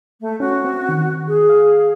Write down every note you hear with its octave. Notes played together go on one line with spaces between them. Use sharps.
A3
C#4 F#4
C4
D#3
G#4
F5